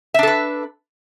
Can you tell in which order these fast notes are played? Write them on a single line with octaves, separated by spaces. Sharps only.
E5 D4 A4 B4